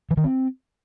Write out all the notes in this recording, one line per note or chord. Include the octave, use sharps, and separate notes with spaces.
E3
D#3
C4